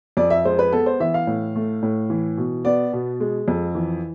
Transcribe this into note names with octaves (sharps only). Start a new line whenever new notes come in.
F2 D5
E5
G#3 C5
B4
B3 A4
C5
E3 E5
F5
A2
A3
A2
E3
B2
B3 D5
B2
G#3
F2
E3